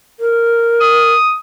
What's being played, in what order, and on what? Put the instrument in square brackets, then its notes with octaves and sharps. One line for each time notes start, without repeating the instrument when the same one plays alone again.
[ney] A#4
[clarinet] D#6